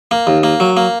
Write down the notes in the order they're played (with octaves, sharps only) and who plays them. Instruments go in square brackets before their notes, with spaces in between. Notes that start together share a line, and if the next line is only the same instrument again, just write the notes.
[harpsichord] A#3
D#2
A#3
F#3
A#3